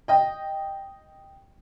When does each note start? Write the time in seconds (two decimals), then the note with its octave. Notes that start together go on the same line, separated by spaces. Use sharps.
0.08 D#5 G5